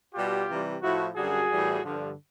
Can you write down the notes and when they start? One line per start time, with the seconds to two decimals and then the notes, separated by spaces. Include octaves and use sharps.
0.15 B2 G3 F4 G4
0.49 C3 E3 G3
0.82 A2 F3 E4 F#4
1.16 F#2 D3 G3 F#4 G#4
1.50 A2 E3 G3
1.83 G2 D3 F3